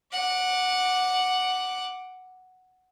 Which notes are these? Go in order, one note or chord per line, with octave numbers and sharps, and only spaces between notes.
F#5 D6